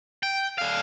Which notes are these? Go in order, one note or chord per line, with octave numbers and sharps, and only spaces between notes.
G5
D3 F5